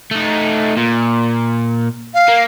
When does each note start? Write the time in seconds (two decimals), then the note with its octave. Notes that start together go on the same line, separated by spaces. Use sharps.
0.11 A3 D#4
0.77 A#2
2.14 F5
2.29 A#3